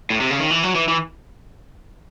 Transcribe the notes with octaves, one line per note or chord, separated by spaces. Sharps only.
A2
C3
C#3
D#3
E3
F#3
E3
E3